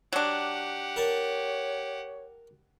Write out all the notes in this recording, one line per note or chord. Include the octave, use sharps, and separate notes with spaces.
F#3 D4 G4 F#5
A#4 C#5 A5